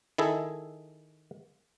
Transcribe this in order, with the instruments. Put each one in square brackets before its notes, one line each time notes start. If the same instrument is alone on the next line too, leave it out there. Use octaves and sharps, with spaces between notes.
[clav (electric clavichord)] D#3 E4 G#4 A4